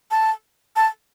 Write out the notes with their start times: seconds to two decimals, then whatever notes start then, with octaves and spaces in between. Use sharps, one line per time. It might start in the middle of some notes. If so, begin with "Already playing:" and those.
0.11 A5
0.76 A5